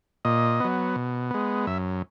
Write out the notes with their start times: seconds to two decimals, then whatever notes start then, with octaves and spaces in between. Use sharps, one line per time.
0.25 A#2 D#5
0.60 F#3 B3
0.96 B2
1.31 G#3 B3
1.67 F#2 E5